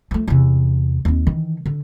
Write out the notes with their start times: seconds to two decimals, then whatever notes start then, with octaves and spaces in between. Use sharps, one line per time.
0.11 F3 A3
0.28 E2 C3
1.05 D#2 C4
1.27 D#3 E3
1.66 D3